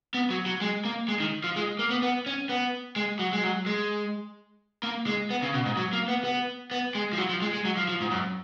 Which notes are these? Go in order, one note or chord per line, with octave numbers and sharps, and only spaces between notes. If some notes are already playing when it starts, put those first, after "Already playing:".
B3
F#3
F#3
G#3
A#3
G#3
D#3
F3
G#3
A#3
B3
B3
C#4
B3
G#3
F#3
G#3
F#3
G#3
A#3
G#3
B3
C#3
B2
G#2
F#3
A#3
B3
B3
B3
G#3
F3
F#3
F3
G#3
G#3
F#3
F3
F3
G#2
F#2